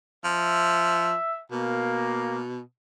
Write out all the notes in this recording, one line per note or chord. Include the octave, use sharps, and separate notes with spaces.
F3 E5
B2 A#3